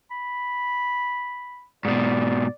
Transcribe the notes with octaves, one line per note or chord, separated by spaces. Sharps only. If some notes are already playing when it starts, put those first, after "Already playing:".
B5
G#2 B2 D5